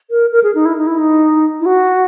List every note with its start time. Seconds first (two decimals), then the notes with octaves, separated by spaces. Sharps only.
0.10 A#4
0.32 A#4
0.43 G#4
0.55 D#4
0.65 E4
0.77 D#4
0.87 E4
0.98 D#4
1.60 E4
1.66 F#4